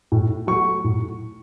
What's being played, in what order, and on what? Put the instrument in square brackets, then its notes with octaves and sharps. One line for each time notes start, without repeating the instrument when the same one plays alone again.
[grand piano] A2
F#3 A3 C#6
A2